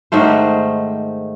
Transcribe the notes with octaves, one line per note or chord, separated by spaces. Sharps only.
G#2 D#3 A3 C5